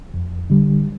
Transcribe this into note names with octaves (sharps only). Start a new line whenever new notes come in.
F2
D3 G3